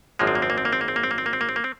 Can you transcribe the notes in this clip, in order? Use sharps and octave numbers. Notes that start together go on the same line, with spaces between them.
G#1 F#2 F3 G#3 A#3
C4
A#3
C4
A#3
C4
A#3
C4
A#3
C4
A#3
C4
A#3
C4
A#3
C4
A#3
C4
A#3
C4